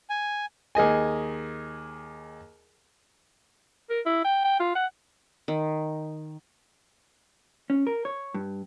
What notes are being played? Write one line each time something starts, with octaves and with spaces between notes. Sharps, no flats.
G#5
D#2 G#4 D#5 G#5
A#4
E4
G5
G5
F4
F#5
D#3
C#4
A#4
C#5
G2